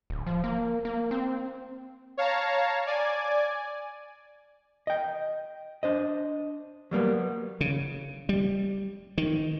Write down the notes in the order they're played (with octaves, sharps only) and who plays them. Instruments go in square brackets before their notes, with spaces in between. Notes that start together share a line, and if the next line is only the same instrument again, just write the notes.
[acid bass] D1
F3
A#3
A#3
C4
[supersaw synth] C#5 F5 A5 A#5
D5 G#5
[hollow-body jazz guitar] D#5 G5
D4 C5 D#5
F#3 G3 A#3 B3
[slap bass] C#3
G3
D#3